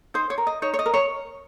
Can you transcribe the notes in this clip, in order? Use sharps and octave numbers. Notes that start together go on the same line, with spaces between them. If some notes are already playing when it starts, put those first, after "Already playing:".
D#4 C5
C#5
A#4
D#5
D#4 C#5
C#5
D#5
A#4
C#5